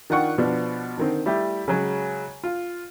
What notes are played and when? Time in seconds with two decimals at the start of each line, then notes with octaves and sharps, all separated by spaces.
0.10 D#3 D4 F4 F#5 G5 C#6
0.38 B2 F3 B3 D4
0.98 D3 D#3 C4
1.26 G3 A3 E4 G4
1.68 C#3 F#3 G#3
2.44 F4